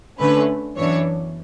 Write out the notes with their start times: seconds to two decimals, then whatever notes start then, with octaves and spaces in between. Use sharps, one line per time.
0.19 D3 A3 C#4 B4
0.77 F#2 E3 B3 D4 C#5